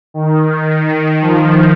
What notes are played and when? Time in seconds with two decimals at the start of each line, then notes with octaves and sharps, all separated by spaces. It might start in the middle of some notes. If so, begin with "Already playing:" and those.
0.14 D#3
0.85 D#3
1.21 F3